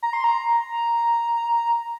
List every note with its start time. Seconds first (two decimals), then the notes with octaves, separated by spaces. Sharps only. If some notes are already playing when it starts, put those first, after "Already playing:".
0.03 A#5
0.13 C6
0.24 A#5